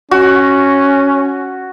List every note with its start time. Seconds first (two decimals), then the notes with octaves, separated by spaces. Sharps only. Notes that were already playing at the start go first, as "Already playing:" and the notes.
0.11 C#4 F#4